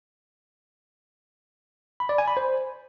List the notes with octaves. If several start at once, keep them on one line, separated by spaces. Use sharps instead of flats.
B5
D5
G#5
B5
C5